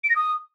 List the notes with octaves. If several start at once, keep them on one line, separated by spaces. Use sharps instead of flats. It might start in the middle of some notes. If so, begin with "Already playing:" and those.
D7
A#6
D#6